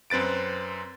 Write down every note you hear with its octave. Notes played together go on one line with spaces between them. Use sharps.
F#2 C4 B4 A6 D7